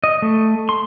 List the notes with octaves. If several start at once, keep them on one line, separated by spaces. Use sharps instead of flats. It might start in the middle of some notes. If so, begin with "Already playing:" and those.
D#5
A3
C6